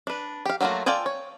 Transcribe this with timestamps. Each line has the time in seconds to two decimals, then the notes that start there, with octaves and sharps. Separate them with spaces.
0.07 D4 B4
0.45 G4 F5
0.61 F#3 A3 A#3 F4 F#4
0.86 F4 A4 D5 G5 G#5
1.06 C#5